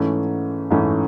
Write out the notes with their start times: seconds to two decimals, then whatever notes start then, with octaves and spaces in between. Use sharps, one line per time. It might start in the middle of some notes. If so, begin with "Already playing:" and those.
Already playing: G#2 E3 A3 C#4
0.70 G#2 E3 A3 C#4